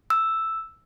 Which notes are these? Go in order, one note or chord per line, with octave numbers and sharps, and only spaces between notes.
E6